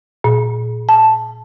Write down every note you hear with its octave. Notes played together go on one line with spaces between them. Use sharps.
A#2
A5